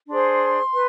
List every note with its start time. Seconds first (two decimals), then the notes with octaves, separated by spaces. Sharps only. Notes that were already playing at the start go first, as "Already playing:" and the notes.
0.09 D4 G#4 C5 C6
0.73 B4